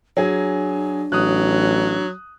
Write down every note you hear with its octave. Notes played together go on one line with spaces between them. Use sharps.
F#3 D4 G#4 G#5
A1 F#3 D#6 F#6